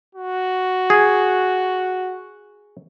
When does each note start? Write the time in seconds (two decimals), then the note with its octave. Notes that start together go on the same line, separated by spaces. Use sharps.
0.15 F#4
0.90 G#4